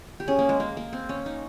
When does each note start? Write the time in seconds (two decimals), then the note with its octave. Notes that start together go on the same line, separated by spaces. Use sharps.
0.20 G4
0.28 C#4 G#4
0.39 A#3
0.49 G#3
0.60 A#3
0.77 A#3
0.93 C4
1.09 C#4
1.26 D#4